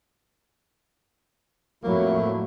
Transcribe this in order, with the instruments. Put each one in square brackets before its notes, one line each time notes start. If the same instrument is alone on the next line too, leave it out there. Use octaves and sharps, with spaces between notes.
[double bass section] F2 A2 F#3 [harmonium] A3 E4 [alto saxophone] A#3